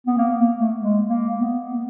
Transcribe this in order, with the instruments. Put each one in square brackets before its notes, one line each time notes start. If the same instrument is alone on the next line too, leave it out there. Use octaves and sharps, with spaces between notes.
[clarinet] B3
A#3
A#3
A3
G#3
A#3
B3
B3